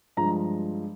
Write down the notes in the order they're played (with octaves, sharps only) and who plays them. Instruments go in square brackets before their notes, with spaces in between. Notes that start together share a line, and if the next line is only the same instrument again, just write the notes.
[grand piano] G2 F3 G#3 A#5